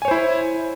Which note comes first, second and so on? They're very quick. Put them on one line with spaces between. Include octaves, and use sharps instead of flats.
G#5 C#5 C5 E4